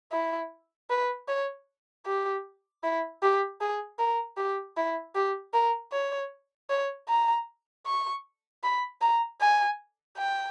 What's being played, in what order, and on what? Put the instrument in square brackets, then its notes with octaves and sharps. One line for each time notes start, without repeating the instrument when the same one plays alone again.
[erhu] E4
B4
C#5
G4
E4
G4
G#4
A#4
G4
E4
G4
A#4
C#5
C#5
A#5
C#6
B5
A#5
G#5
G5